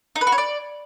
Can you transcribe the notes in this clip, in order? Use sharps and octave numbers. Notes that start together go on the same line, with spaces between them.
D#4
B4
F#4
C#5
D5